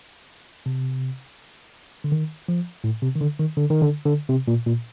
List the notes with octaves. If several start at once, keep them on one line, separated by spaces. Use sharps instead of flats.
C3
D3
D#3
F3
A2
C3
D#3
D3
D#3
D3
D#3
D3
D3
C3
A#2
A#2